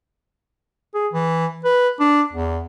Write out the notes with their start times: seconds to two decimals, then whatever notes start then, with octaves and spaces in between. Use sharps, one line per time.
0.95 G#4
1.13 E3
1.64 B4
2.00 D4
2.33 E2